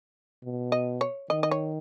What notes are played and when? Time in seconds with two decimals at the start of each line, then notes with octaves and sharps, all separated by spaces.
0.44 B2
0.72 D#5
1.01 C#5
1.30 D#3 D#5
1.43 D#5
1.51 C#5